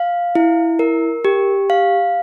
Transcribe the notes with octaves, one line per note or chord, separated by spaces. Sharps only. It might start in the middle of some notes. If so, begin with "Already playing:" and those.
Already playing: F5
E4
A#4
G4
F5